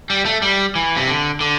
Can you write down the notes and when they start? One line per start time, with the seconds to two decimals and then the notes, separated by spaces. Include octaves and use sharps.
0.10 G3
0.25 A3
0.42 G3
0.75 E3
0.97 C3
1.08 D3
1.41 D3